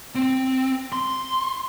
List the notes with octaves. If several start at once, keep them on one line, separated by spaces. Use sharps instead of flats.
C4
C6